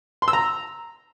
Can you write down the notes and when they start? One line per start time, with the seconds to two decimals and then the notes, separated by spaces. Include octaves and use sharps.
0.22 C6
0.28 E6
0.33 A#5